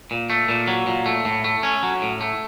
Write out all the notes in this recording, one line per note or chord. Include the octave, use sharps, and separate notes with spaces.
A#2
A3
A#2
F#3
A#2
A3
A2
A3
C#4
F#3
A2
A3